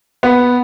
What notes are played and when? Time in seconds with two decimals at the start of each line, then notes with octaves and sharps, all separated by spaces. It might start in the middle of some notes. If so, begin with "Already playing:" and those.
0.23 B3